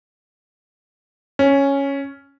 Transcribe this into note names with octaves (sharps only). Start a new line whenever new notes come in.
C#4